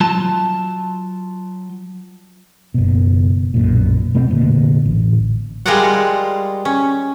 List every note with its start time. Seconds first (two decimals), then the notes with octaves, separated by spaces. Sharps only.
0.01 F#3 F4 A5
2.74 F#1 B2
3.54 B1 F#2 A#2
4.14 E1 B2 A3 C4
4.29 F1 A#2 D3
4.86 A1
5.66 G3 G#3 F4 A#4 D5 F#5
6.65 C#4